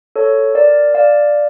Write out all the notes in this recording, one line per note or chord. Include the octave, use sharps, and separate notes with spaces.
A4 C#5
A#4 D5
D5 F5